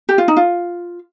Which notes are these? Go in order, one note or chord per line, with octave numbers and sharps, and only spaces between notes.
G4
F4
D#4
F4